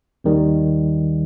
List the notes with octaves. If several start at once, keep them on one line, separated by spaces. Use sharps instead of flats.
D#2 D#3 G3